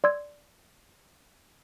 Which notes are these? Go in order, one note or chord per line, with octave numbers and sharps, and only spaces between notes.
D5 C6 E6 G#6